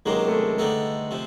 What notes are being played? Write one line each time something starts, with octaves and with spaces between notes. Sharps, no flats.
C#2 C3 D#3 F#3 G#3 A#3
A3
G#3
D3 G3 A3 B3 D#4
C3 F3